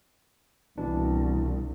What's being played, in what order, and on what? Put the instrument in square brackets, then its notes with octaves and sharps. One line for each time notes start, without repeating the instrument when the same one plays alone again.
[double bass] C2 [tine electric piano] B2 E3 D4